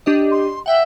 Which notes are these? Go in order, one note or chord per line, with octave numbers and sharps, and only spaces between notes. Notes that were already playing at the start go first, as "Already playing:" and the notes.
D4 G4 D#5
C6
E5 F#5 G5